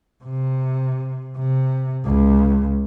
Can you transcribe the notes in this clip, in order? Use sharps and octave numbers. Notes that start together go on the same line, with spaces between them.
C3
C3
C#2